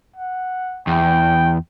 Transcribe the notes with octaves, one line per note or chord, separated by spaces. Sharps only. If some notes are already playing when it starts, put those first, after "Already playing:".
F#5
E2 G5